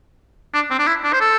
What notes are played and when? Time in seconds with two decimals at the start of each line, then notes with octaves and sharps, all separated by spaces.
0.54 D4
0.71 C4
0.79 D4
0.87 E4
1.04 D4
1.13 C5
1.21 A4